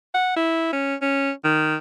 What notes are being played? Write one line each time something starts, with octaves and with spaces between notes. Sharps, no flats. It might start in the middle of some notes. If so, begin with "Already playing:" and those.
F#5
E4
C#4
C#4
D#3